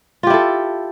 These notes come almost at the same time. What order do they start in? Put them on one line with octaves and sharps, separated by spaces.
F4 G4 E4 A4